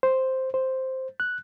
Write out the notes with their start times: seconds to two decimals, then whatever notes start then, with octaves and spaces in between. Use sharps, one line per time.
0.03 C5
0.54 C5
1.20 F#6